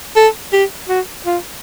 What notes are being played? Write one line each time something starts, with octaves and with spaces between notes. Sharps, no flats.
A4
G4
F#4
F4